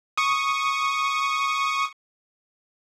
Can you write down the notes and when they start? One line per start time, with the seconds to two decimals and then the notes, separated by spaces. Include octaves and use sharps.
0.17 C#6 D#6